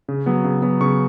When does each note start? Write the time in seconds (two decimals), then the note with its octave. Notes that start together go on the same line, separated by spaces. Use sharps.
0.08 C#3
0.26 F#3 B3
0.44 C#3
0.62 F#3 B3
0.81 C#3 C#6